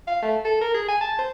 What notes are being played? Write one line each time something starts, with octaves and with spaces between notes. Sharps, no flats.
F5
A3
A4
A#4
G#4
G#5
A5
C5